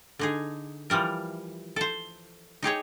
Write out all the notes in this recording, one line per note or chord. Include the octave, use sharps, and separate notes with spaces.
D3 D#4 G#4
E3 F3 G3 A#4
A4 C5
D#4 G4 G#4 C#5